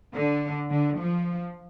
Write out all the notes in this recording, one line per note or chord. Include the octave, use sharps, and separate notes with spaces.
D3
D3
F3